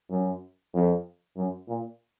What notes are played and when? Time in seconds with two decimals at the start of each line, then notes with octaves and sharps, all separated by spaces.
0.10 F#2
0.74 F2
1.37 F#2
1.68 A#2